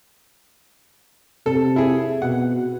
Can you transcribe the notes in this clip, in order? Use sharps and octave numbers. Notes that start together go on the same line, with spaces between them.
C3 A4
E4 G#4
B2 F#5